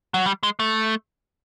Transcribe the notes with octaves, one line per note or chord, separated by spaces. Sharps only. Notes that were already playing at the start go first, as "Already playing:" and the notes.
F#3
G3
G#3
A3